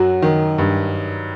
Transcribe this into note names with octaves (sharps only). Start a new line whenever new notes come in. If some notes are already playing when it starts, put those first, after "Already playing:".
Already playing: F#2 F#3 F#4
D#3
G2